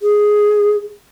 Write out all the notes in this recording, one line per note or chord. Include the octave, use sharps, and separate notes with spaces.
G#4